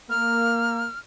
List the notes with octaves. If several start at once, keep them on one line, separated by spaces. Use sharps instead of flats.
A#3 F6